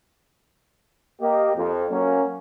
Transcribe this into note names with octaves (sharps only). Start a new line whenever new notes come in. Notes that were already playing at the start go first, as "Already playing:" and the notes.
A#3 G4 D#5
F2
F#3 A#3 C#4